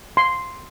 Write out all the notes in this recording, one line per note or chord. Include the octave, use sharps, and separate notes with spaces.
C6